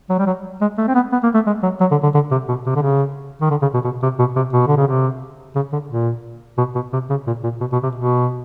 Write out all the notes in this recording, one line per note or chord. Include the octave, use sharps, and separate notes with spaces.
F#3
G3
F#3
G#3
A3
C4
B3
B3
A#3
A3
G#3
F#3
F#3
D3
D3
D3
C3
B2
C3
D3
C#3
D#3
D3
C#3
B2
B2
C3
B2
C3
B2
D3
C#3
C3
C#3
D3
A#2
B2
B2
C3
C#3
A#2
A#2
B2
B2
C3
B2